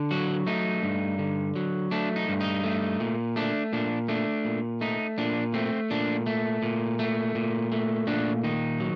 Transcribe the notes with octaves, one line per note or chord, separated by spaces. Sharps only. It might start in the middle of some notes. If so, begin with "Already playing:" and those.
Already playing: D3
F#3 F#4
A3 D#4
G2
D3
F#3
A3 D4
D#4
G2
D#4
A3
A#2
A3 D4
A#2 D4
A3 D4
A#2
A3 D#4
A#2 D4
A3 C4
A#2 D4
A3
A#2
A3
A#2
A3
A#2 D4
D#3 D#4
F#3